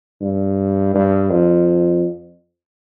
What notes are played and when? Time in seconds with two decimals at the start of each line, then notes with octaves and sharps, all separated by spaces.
0.21 G2
0.94 G2
1.30 F2